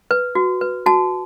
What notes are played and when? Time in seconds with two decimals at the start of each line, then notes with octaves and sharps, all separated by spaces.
0.11 B4
0.35 F#4
0.61 B4
0.86 F#4 A5